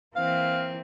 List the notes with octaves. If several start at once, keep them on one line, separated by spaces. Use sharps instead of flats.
E3 A#3 C4 F5